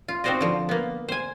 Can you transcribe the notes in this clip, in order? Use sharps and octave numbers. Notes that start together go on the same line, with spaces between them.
F4
C4 D#4 F#4 C5 D5 D#5
D3 F3
A#3 B3
C5 G#5